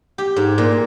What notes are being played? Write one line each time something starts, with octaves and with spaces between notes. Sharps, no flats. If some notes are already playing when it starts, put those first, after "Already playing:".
G4
G#2
A#2